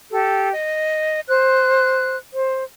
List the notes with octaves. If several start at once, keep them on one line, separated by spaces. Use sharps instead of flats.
G4 A4
D#5
C5 F#6
C5